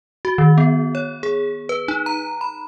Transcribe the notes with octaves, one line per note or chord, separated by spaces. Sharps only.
F#4
D#3
B3
C#5
G#4
B4
D#4
A#5
B5